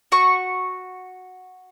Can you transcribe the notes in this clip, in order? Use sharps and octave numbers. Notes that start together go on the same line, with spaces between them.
F#4 C#6